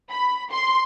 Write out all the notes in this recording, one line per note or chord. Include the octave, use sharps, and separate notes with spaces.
B5
C6